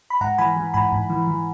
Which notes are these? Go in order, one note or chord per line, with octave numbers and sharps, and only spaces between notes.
B5
G#2 F#5 A#5
E3 G#5 B5
E3
G#2 G#5 B5
G#2
E3
E3